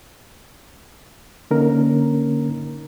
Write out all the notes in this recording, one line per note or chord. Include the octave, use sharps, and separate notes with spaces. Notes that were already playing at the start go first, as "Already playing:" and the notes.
D3 A#3 C#4 D#4 A#4